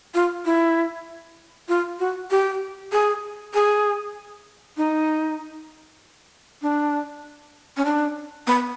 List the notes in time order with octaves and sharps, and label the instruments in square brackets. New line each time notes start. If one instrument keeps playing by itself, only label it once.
[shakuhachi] F4
E4
F4
F#4
G4
G#4
G#4
D#4
D4
C#4
D4
B3